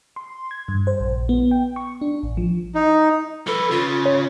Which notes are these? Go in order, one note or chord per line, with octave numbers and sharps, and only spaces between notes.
C6
G#6
G2
C5
A#1
B3
G5
C#6
D4
A1
F3
D#4
F3 A4 B4
C#3 F4
C#5